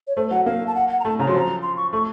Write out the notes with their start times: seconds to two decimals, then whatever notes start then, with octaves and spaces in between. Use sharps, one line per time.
0.08 C#5
0.16 A3 C5
0.31 F#3 F#5
0.46 A#3 F5
0.67 A5
0.75 F#5
0.89 F#5
1.00 A#5
1.04 A3 A5
1.19 C#3 A#5
1.27 F#3 C6
1.34 F3 A#5
1.62 C6
1.77 C#6
1.93 A3 C#6